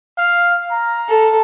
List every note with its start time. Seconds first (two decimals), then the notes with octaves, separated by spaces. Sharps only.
0.18 F5
0.72 A#5
1.09 A4